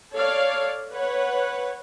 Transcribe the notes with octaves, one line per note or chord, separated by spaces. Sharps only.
A4 C#5 D5 F5
B4 C#5 F#5